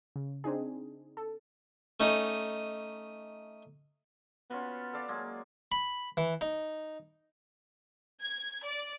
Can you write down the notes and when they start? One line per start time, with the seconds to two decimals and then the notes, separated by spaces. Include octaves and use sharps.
0.16 C#3
0.44 C4 D4 D#4 G#4
1.17 A4
2.00 A3 C#4 D#4
4.50 B3 C#4 F4 F#4
4.93 A4 D5 F5
5.08 F#3 G#3 A#3
5.72 B5
6.17 E3
6.41 D#4
8.22 G#6
8.65 D5